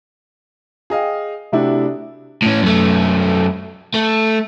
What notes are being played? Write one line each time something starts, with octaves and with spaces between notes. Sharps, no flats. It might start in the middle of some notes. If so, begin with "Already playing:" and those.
G#4 D#5 F5 G5
C3 A3 D4 E4 F#4 G4
A2 C#4
F#2 A3
A3